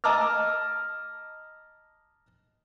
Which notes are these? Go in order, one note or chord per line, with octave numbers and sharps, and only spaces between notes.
D#5 A5 A#5 D6 E6 F6